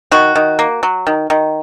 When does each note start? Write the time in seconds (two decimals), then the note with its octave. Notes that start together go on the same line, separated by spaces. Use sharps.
0.11 D#3 F#4
0.35 D#3
0.59 A#3
0.83 F#3
1.07 D#3
1.30 D#3